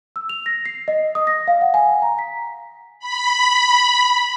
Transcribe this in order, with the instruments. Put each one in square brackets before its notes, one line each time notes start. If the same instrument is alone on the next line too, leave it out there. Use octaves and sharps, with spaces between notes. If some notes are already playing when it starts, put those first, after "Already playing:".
[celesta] E6
F7
A#6
C7
D#5
D#6
A#6
F5
F#5
G#5
A#5
B6
[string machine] B5